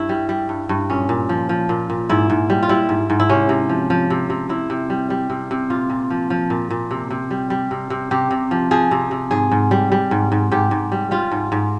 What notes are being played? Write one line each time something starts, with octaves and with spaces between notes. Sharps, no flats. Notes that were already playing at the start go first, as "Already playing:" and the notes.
Already playing: G2 E4
G3
G3
G2
G2
A#2 C#4
A#2
F3
F3
A#2
A#2
G#2 E4
G#2
G3
F4
G3 E4
G#2
G#2
E4
C3 C#4
C3
F3
F3
C3
C3
C3 E4
C3
G3
G3
C3
C3
A#2 F4
A#2
F3
F3
A#2
A#2
C3
C3
G3
G3
C3
C3
C3 G4
C3
F3
F3 G#4
C3
C3
G#2 G#4
G#2
G3
G3
G#2
G#2
G#2 G4
G#2
G3
G3 F4
G#2
G#2